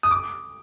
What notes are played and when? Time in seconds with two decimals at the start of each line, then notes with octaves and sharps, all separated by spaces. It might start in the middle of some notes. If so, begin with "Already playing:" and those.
0.03 D#6
0.11 D6